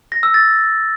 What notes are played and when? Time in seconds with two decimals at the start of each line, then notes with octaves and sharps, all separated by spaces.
0.12 A#6
0.23 E6
0.34 A6